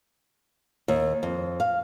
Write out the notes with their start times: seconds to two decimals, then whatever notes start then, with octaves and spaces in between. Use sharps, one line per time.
0.88 D#2
1.23 F2
1.60 F5